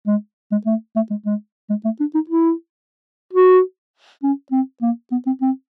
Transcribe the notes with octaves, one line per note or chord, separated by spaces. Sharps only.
G#3
G#3
A3
A3
G#3
G#3
G#3
A3
D4
D#4
E4
F#4
C#4
C4
A#3
B3
C4
C4